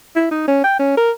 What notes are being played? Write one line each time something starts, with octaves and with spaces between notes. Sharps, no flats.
E4
D#4
C#4
G5
C#4
A#4